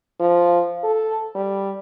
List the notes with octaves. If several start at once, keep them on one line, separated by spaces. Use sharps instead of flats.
F3
A4
G3